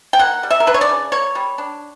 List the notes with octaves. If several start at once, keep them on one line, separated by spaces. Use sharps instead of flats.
G5
A#3 F#5
G3
E5
A#4
D4 B4
C#5
D5
C#3
A#3 C#5
G3
D4